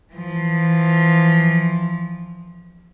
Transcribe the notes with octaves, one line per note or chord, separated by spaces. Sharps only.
E3 F3